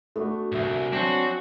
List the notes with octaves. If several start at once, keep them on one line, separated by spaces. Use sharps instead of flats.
A3 B3 D4 F#4
C2 G#2 B3 E5 G#5
F#3 C4 D4 F#4